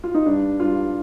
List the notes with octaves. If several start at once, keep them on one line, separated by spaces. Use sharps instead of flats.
F4
D#4
G2 D4
G2 F4